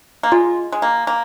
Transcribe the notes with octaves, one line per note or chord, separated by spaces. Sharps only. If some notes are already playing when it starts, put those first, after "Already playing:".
A#3
G#3 F4
G#3
A#3
A#3